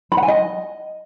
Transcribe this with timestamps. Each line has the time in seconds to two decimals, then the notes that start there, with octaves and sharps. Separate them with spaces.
0.12 B5
0.17 F#5
0.23 G#5
0.28 D#5